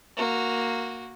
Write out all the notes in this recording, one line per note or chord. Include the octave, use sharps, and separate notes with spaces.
A#3 F#4